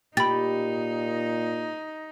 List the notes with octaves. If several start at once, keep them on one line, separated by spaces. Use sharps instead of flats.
A#2 D#4 G4 B5 A6